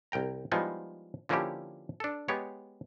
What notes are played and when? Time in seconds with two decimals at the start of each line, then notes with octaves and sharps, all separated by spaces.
0.12 C2 A#4 G5 A#5
0.52 F3 G3 G#3 B3 D#4 E4
1.29 D3 F3 A#3 C#4 E4 G4
2.00 D4 A4
2.28 G#3 B3 G4 C#5